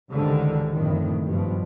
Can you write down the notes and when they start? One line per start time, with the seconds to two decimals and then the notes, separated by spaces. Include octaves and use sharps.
0.10 C#2 G#2 D3 D#3 G3
0.72 F#1 F2 A2 D3 D#3
1.26 G2 B2 F3